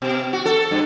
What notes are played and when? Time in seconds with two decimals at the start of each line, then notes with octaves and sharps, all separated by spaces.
0.02 B2
0.33 F#4
0.45 A4
0.71 G2